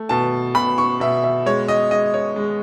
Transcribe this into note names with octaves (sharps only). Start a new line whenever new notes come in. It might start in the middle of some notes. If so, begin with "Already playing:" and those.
Already playing: A3
B2 A5
B2 B5
C#6
B2 E5
E5
G#3 C#5
D#5
G#3 D#5
C#5
G#3